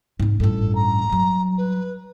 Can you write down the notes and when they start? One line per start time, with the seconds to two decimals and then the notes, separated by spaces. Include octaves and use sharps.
0.20 G#2 C4
0.40 A1 G2 A4
0.75 A#5
1.10 F#3 G3
1.57 B4